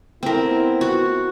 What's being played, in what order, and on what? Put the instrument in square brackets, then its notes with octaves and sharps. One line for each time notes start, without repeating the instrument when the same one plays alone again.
[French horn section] B3 E4 [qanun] C4 A#4
[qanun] F#4